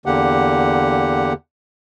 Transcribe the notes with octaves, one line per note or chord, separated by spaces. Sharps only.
E2 D3 A#3 G4 F#5